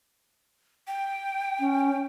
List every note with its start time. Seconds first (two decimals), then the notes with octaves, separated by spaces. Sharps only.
0.87 G5
1.60 C#4